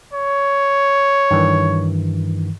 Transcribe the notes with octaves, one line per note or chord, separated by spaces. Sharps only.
C#5
G2 D#3 E3